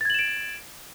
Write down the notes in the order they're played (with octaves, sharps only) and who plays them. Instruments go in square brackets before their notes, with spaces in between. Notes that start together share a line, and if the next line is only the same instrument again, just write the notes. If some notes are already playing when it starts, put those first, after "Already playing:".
[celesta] A6
G#6
F#7
E7
D7